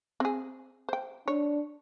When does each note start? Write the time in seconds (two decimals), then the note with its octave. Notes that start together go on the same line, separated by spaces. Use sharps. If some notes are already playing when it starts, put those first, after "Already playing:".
0.20 C4 G#4
0.89 C5 G5
1.28 D4 C#5